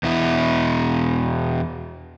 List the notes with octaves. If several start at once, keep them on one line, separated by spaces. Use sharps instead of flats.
E2 B2 E4